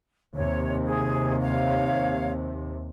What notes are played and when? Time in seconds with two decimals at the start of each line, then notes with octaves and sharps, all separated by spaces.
0.34 D#2 C3 C#5
0.84 G#4
1.40 C#5 F5